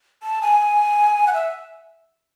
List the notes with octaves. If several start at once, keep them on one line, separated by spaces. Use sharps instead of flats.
A5
G#5
F#5
E5